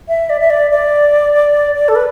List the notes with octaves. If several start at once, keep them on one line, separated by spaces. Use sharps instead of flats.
E5
D5
E5
D5
D5
D5
A4
B4